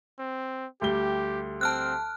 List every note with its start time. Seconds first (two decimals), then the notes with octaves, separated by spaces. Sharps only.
0.19 C4
0.82 D2 G3 G4 G7
1.61 C4 A5 F6 F#6